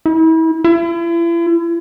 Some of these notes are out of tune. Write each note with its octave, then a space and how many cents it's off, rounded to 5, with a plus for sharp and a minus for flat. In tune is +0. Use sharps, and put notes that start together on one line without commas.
E4 -35
E4 +40